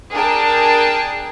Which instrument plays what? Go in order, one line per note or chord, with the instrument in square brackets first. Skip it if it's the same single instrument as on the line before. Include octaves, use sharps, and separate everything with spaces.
[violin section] D4 G#4 A#4 G5 A5